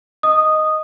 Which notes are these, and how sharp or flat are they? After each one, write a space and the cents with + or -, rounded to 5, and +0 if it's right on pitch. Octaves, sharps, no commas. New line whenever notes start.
D#5 +0 D#6 -10